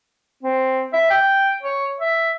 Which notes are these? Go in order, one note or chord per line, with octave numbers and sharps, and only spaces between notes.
C4
E5
G5
C#5
E5